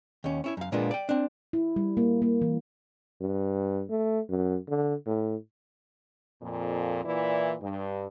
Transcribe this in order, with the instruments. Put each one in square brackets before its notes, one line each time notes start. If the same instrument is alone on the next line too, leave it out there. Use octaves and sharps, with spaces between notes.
[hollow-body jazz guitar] D#2 C#4
C#4 E4 C#5
F#2 F5
A#2 G#3 A#3 B3 D4 F4
D5 G5
C4 D4
[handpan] E4
G3
A#3
A#3
E3
[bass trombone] G2
A3
F#2
D3
A2
[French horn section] F2 A#2
A#2 E3 E4 D5
G2